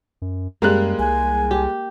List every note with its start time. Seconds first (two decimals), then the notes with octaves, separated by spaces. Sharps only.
0.22 F#2
0.62 F#2 G3 G#3 A#3 F#6
0.99 C2 G#5
1.51 G4